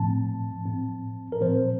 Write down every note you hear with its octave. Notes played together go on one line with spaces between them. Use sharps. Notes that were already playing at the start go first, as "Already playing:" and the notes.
Already playing: A2 F3 A3 C4 A5
A2 F3 C4
A#4
A#2 F3 C4 C5